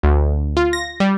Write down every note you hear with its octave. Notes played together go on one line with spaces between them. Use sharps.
D2
F4
A#6
G3